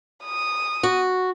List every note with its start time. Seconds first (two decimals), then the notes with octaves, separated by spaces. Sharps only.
0.24 D#6
0.83 F#4